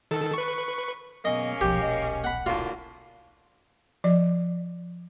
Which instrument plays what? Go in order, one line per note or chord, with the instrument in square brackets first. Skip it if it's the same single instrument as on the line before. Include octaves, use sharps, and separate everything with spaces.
[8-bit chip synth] D#3 A4
B4 C#6
[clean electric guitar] F#2 B2 [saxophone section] G#3 A#3 C#4 [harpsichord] D#5
[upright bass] D#1 B1 [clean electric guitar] F3 [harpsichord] G4
[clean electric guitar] D#5
[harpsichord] F#5 B5
[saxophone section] A2 D3 A#3 [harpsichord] F4 [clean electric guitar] F#4 F#5
[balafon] F3 D5 D#5